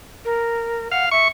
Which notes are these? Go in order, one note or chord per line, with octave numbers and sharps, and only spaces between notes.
A#4
F5 F#5
E5 C#6